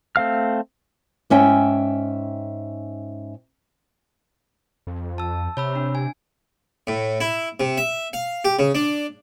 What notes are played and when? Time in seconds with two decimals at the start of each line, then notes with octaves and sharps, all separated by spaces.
0.16 A3 C4 F5 F6
1.30 G#2 C#4 E5 G5
4.87 F2
5.18 A5 E6
5.57 C3 C#5 B5 E6
5.76 D4
5.95 G#5
6.87 A2
7.21 E4
7.60 C3
7.78 E5
8.13 F5
8.45 G4
8.59 C#3
8.75 D4